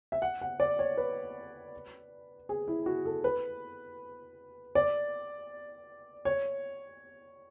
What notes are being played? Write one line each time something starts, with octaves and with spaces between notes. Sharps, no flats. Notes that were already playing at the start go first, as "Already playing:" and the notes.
E5
F#5
F#5
D5
C#5
B4
G#4
E4
F#4
A4
B4
D5
C#5